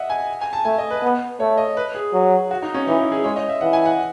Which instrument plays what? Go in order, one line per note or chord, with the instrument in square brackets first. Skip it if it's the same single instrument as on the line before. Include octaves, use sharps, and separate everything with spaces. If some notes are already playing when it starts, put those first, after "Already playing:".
Already playing: [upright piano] D#5 E5 F#5
G#5
G#5
A5
[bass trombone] A3 [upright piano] G#5
[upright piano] D#5
B4
[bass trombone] B3
[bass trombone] A3 [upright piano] C#5
[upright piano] D#5
B4
G#4
[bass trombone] F#3
[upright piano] F#4
D#4
C#4
[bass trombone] E3 [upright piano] D#4
[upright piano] E4
G#4
[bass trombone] G#3 [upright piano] C#5
[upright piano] D#5
E5
[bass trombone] E3 [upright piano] F#5
[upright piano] G#5
F#5